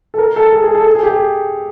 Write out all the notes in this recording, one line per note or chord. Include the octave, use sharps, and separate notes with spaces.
A4
A#4
A4
G#4
G#4
A4
A4
G#4
G4
G#4